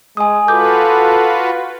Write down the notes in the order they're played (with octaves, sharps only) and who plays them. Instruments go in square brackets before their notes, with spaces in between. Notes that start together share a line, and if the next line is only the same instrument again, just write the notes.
[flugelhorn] G#3 [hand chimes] G#5 D#6
[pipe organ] F4 F#4 B4 [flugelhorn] A4 [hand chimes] D6 G6